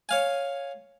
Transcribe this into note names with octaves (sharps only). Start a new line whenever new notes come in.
C#5 F5 G#5